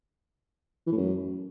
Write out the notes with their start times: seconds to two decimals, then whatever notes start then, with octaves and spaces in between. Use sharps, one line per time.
0.87 E3
0.92 A2
0.97 F#2